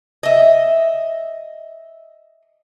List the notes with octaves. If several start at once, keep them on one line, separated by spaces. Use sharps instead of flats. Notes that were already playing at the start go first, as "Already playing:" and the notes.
D#5 E5